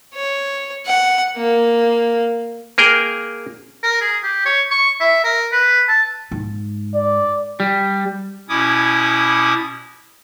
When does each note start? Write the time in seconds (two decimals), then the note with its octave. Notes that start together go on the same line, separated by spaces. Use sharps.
0.14 C#5
0.86 F#5
1.37 A#3
2.78 A#3 G#4 A#4 G5
3.83 A#4
4.01 G#4
4.23 G4
4.45 C#5
4.71 C#6
5.00 E5
5.24 A#4
5.52 B4
5.88 A5
6.31 G#2
6.95 D5
7.60 G3
8.49 B2 C#4 E4 D6 D#6 G#6